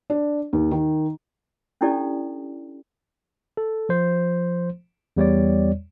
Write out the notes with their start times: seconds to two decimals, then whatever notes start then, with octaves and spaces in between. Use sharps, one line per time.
0.10 D4
0.53 D#2
0.71 D#3
1.81 C#4 D4 E4 G4 A4 D5
3.57 A4
3.89 F3 C5
5.17 E2 G3 C#5 D5